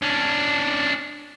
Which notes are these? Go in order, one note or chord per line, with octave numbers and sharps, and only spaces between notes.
C#4 D4